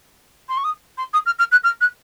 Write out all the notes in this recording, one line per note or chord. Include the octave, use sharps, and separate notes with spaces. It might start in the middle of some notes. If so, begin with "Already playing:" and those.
C6
C#6
D#6
C6
D#6
F6
F6
F#6
F6
F#6